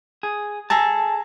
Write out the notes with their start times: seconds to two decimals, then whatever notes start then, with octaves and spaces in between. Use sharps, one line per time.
0.23 G#4
0.70 G#4 A4 A5 A#5